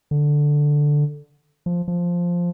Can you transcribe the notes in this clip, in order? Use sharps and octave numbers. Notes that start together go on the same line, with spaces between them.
D3
F3
F3